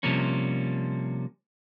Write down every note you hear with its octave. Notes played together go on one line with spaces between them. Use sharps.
C3 F3 G3 A#3 C#4